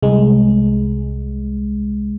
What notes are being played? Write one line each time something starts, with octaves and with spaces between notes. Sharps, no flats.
C2 G#3